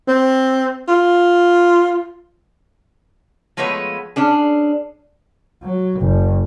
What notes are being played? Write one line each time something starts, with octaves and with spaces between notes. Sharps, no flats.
C4
F4
F3 G#3 A3 B3 B4 C#5
C#4 D4 G#4
F#3
F#1